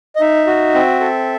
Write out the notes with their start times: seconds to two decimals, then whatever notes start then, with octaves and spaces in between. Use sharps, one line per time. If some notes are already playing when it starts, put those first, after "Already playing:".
0.16 D#5
0.21 D#4 E5
0.47 F#4
0.74 C4
1.00 A4